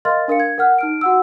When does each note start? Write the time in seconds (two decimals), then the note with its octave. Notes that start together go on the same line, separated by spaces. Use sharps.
0.05 A#4 D#5 F5 C6 F6 A6
0.28 D4 A#4 F5 C#7
0.40 G#6
0.58 A#4 F#5 F6 F#6
0.78 D#4 F6 D7
1.01 F#4 F#5 E6